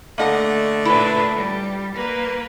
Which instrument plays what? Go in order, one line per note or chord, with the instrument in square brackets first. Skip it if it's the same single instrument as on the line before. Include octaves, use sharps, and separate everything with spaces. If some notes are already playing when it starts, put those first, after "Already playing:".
[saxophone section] D3 A3 [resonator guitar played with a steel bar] A#3 D#5 F#5
[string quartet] A#2 D4 B4 [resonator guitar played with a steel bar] E4
[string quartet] G3
A#3 B4